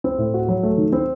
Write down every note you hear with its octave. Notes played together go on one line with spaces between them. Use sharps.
C4
A2
F#4
F#3
A3
D#3
C4